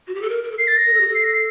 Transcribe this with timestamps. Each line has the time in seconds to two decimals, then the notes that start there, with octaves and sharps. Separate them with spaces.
0.07 F#4
0.15 G4
0.22 A4
0.29 A#4
0.44 A#4
0.52 A4
0.58 A#4 C7
0.68 A6
0.77 A#6
0.86 A#4
0.94 A4
1.01 G4
1.08 A4
1.15 C7
1.24 A#6
1.34 C7